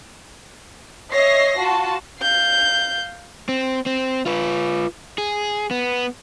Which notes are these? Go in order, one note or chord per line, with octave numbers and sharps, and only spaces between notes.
C#5 D#5 E5 A#6 C7
F4 F#4 A5
F5 G6
C4
C4
F4 B4
G#4
B3